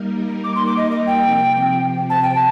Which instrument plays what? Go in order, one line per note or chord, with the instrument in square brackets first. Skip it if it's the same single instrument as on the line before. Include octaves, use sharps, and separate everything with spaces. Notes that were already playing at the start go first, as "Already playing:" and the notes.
Already playing: [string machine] G3 A#3 D#4 A#4
[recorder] D6
C6
D6
D#5
D#5
G5
[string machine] C3 F3 C4
[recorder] A5
G5
A5